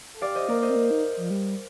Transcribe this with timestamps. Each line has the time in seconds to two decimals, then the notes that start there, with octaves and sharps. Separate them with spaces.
0.14 A4
0.21 G4 D5 F5
0.35 C5 D#5
0.49 A#3 A#4 D5
0.62 C5 D#5
0.70 C4
0.76 A#3
0.90 D#4
1.17 F3
1.30 G3